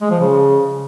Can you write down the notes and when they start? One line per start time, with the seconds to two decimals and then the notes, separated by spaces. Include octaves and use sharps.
0.01 G#3
0.11 F3
0.20 C#3